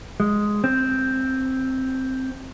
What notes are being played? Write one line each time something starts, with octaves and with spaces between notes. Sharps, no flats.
G#3
C4